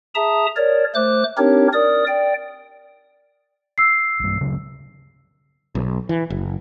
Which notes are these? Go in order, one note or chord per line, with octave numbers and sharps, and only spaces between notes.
G#4 E5 A5 A#5 D#6
A#4 C#5 D5
A3 C5 D6 F#6
C4 D4 D#4 G4 A#4 C#5
A#4 D5 D#6
D5 G5
E6 C7
B1 G2
D1 C#3 F#3
B1
E3
F#1